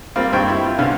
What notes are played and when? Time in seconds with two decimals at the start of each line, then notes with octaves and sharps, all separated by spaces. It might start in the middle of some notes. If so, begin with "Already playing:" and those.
0.16 G3 A#3 C4 F4 F5
0.32 G2 G3 C4 D#4 G5 C#6
0.49 E4 E5
0.66 F4
0.78 C2 D3 B3 C#4 F5